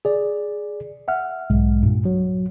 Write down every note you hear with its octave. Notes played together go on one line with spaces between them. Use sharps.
G#4 D5
E5 F#5 F6
B1 G#2 G#3
G2 A#2
F#3